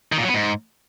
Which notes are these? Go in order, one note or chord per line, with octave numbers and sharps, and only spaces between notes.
D#3
A#2
F#3
B3
G#2